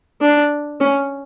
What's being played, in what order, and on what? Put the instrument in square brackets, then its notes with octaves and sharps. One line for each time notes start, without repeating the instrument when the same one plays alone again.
[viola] D4
C#4